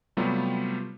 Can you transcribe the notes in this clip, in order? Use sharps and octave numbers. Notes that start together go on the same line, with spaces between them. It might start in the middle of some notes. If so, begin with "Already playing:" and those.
C3 F#3 G3 A3 B3 F4